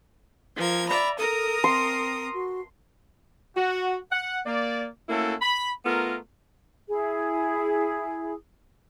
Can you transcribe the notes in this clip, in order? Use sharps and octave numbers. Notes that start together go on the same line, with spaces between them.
F3 A#4 G#6
D5 E5 A#5 B5
A4 A#4 A#5 D#6
C4 C6
F#4
F#4
F#5
A#3 D5
A3 A#3 C#4 E4 F#4 A4
B5
A3 B3 F4 A#4
E4 G#4